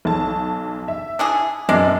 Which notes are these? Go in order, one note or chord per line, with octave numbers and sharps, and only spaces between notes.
B1 A5
E5
D4 E4 G#4
F#2 B2 G#3 D4